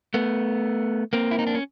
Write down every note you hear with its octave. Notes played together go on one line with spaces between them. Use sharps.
A3 B3
A#3 C4
E4
D#4
D4
C#4